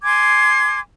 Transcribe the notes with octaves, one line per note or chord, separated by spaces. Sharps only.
G#5 C6 D6 G#6